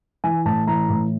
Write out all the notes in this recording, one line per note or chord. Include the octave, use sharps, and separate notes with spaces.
E3 G#5
A2 A5
E3 A#5
A2